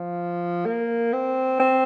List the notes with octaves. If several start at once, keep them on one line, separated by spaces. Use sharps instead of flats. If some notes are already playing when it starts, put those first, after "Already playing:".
Already playing: F3
A#3
C4
C4